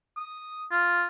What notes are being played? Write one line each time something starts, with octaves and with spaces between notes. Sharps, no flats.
D#6
F4